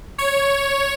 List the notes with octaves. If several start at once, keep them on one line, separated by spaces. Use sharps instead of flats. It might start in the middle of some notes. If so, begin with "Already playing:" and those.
C#5